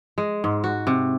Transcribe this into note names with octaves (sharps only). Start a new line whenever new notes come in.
G#3
G#2
F#4
C3